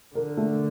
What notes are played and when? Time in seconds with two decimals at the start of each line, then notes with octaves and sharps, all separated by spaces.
0.15 D3 A#4
0.37 A3